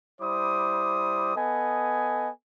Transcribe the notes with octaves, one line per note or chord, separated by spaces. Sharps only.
G3 E4 C5 D6 D#6
B3 A4 D#5 G#5